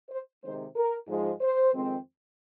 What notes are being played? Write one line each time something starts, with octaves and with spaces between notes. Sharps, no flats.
C5
C3 D#3 G#3 C4 C5
A#4
G#2 F3 G#3
C5
F2 D#3 G#3 C4